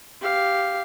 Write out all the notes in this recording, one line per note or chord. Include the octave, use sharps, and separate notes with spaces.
G4 F5